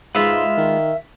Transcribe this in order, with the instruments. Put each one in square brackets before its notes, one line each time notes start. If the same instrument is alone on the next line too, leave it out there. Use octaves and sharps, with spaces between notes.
[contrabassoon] G#2 [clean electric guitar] G#3 F4 B4 [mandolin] E5 F5
[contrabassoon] D#3